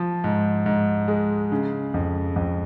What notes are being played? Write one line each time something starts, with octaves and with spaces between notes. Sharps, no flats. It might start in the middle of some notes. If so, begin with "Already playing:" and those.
Already playing: F3
G#2
G#2
G#3
C#3
F2
F2